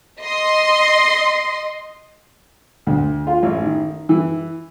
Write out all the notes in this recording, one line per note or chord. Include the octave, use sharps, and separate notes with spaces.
D#5 C6
D2
F4
A1
D#3
E3